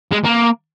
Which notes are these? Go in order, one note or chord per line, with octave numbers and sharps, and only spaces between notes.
G#3
A#3